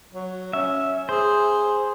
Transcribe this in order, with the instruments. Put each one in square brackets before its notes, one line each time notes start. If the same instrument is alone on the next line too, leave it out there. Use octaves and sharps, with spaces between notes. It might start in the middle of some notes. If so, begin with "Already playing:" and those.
[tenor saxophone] F#3
[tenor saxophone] C#4 [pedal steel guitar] E5
[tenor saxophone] G#4 [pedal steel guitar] C5